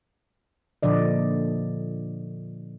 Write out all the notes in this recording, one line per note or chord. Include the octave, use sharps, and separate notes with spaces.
A#2 D3 F3 D5 D#5